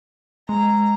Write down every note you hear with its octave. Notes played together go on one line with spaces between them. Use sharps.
G#3 A#5